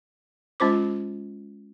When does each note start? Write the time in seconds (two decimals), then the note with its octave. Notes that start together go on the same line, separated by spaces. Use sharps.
0.60 G#3 C#4 F4 C5 D6